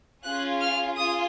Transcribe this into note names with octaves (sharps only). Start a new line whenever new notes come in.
C#4 F4 G#4 F#6
F6
F4 G#4 D#6